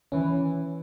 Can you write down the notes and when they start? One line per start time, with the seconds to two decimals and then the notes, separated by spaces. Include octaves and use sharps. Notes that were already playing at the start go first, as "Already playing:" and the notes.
0.12 E3 C#4